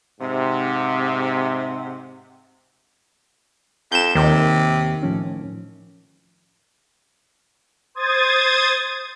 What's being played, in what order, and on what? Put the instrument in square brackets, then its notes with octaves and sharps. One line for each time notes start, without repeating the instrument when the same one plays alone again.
[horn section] G#2 C3
[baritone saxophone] F2 [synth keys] G6 E7
[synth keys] D#2 [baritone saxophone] C3 [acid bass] D#3
[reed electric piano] A2 F3 C#4
[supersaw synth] C5 D#6 G#6 A6